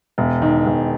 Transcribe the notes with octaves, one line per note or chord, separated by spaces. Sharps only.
E1
D#3
E1